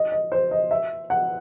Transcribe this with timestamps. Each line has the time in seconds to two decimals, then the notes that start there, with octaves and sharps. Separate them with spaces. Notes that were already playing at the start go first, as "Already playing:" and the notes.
Already playing: D#5
0.12 D#5
0.32 C5
0.51 D#5
0.71 E5
1.10 F#5